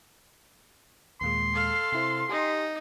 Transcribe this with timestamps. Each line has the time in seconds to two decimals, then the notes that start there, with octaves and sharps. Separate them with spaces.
1.21 D#2 A#2 G#3 C6
1.53 A4 F5
1.92 C3 E4 C5
2.29 D#4 G4 G#5